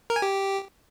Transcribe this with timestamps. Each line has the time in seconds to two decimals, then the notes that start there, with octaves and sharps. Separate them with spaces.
0.10 A#4
0.16 G#5
0.22 G4